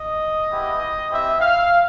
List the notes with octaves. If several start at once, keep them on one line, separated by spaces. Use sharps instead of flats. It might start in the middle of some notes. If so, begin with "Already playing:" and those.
Already playing: D#5
G#3 B3 E4 G4
C4 E4 G4 E5
F5